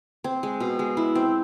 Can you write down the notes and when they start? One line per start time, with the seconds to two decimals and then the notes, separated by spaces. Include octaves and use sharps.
0.24 C4
0.43 G#3
0.60 B2
0.79 G#3
0.97 E4
1.15 C4